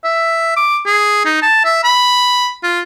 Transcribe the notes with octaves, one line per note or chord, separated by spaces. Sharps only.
E5
D6
G#4
D#4
A5
E5
B5
F4